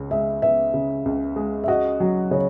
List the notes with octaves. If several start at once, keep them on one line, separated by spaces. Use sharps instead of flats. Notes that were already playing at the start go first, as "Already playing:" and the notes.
Already playing: C#2 C#3
G#3 E5
B3 E5
C#3
C#2
G#3
E5
F#4 D#5
F#3
C#3 C#5